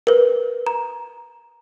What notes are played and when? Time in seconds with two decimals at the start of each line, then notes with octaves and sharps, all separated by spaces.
0.07 A#4 B4
0.67 A#5